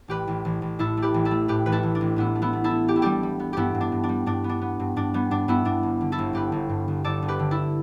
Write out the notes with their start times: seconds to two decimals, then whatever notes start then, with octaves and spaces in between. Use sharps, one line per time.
0.08 A1 G4 B4
0.28 A1
0.45 A1
0.62 A1
0.79 A2 E4 A4
0.97 A3
1.02 G4 B4
1.14 A1
1.25 E4 A4
1.31 A3
1.48 A2 G4 B4
1.66 A1 B4
1.72 E4 A4
1.83 A1
1.95 D4
2.01 A1
2.16 A2 B3 E4
2.35 A3
2.42 B3 E4
2.53 A3
2.64 E4 A4
2.71 A3
2.88 B3 G4
2.96 E4
3.02 G3 D4 G4
3.23 G3
3.40 B3
3.53 G2 B3 E4 G4
3.74 G2
3.81 D4
3.92 G2
4.03 D4
4.09 G3
4.26 G2 D4
4.44 B3
4.49 D4
4.62 B3
4.80 G2
4.96 G2 D4
5.14 G3 B3
5.31 G2 D4
5.48 G2 B3 E4
5.65 G2 D4
5.83 G1
6.01 D3
6.12 E4 A4
6.18 G1
6.33 G2 G4 B4
6.52 G1
6.69 G2
6.88 G1
7.04 G1 A4 D5
7.22 G1
7.28 G4 B4
7.39 D3
7.51 E4 A4